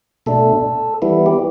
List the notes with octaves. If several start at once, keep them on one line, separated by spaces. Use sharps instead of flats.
B2 A3 D4 A4
E3 G3 B3 E4
G4